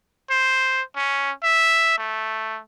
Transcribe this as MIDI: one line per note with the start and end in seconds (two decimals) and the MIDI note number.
0.30 0.82 72
0.96 1.31 61
1.43 1.96 76
1.98 2.59 57